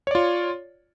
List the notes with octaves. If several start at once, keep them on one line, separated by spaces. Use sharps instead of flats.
F4 C#5 D5